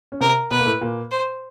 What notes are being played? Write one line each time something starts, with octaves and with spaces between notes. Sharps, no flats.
C#4
C3 C4 A#4
B2 B3 B4
A#3
A2 A3
A#2 A#3
C5